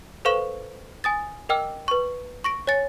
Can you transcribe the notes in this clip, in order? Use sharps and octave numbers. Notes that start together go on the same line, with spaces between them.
A4 B4 C5 F5 C#6 E7
G#5 D#6 A6
A#4 D#5 G5 D6 E6 F6
B4 C#6
C#6 A#6 D7
C#5 G#5 A6 C#7